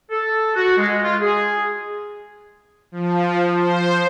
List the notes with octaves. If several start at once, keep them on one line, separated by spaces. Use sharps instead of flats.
A4
F#4
G#3
F4
G#4
F3
C5